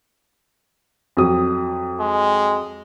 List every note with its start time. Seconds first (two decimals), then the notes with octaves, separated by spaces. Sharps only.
1.17 F2 F#3 D#6
2.00 G#3